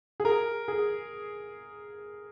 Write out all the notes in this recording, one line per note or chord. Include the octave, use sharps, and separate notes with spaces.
G#4
A#4
G#4